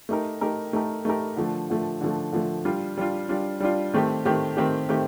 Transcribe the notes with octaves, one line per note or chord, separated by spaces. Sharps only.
A3 D#4 G4 A#4
A3 D#4 G4 A#4
A3 D#4 G4 A#4
A3 D#4 G4 A#4
D3 F3 A3
D3 F3 A3
D3 F3 A3
D3 F3 A3
G3 D4 F4
G3 D4 F4
G3 D4 F4
G3 D4 F4
D#3 A3 C4 G4
D#3 A3 C4 G4
D#3 A3 C4 G4
D#3 A3 C4 G4